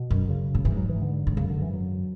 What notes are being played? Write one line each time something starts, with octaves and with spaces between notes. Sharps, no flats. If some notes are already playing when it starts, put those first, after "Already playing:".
Already playing: B2
F#2
C#3
A2
G#2 E3
F#3
E3
D3
G#2
F#2 C#3
D3
E3
F#3